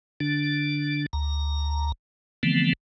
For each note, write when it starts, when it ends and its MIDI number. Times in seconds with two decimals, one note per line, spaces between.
0.20 1.06 50
0.20 1.06 62
1.13 1.92 38
1.13 1.92 82
2.43 2.73 50
2.43 2.73 52
2.43 2.73 53
2.43 2.73 57
2.43 2.73 59
2.43 2.73 60